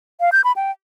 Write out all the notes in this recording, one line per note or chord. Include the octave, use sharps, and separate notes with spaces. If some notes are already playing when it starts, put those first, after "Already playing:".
F5
G6
B5
G5